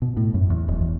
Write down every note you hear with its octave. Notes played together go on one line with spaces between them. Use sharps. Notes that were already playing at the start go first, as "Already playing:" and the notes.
B2
A2
F#2
E2
E1
E2